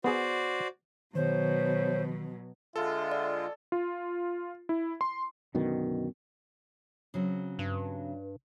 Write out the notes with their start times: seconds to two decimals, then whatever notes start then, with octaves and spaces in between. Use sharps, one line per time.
0.04 B3 F#4 G#4 C5 D5
1.15 B2 D#3 F#3 C5 C#5
2.76 D3 G#3 F4 A4 E5
3.12 D5
3.72 F4
4.69 E4
5.01 C6
5.55 F#2 B2 D3 D#3
7.14 C#3 F#3 C4
7.59 G2